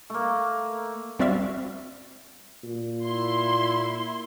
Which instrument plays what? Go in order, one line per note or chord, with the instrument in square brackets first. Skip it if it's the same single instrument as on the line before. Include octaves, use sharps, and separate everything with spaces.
[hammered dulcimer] A3 A#3
[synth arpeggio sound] G3 C4 F#4 D5 E5 F5
[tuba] A#2
[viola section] E4 C6